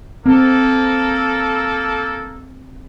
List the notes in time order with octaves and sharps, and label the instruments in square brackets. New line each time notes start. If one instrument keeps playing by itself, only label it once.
[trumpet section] A#3 A4 [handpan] C4